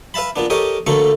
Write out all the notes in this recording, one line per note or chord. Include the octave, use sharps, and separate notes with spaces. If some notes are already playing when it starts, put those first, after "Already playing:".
B4 E5 F5 A5 B5
A#2 B3 D4
G4 A4 A#4 C#5 D#5
D2 D3 A3 A#3 A4 C#6